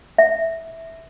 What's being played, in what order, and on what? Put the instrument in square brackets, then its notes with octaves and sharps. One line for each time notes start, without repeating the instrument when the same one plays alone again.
[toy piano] E5